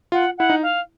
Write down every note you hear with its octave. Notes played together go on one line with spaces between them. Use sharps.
F4 F#5
E4 F#5
D#4
F5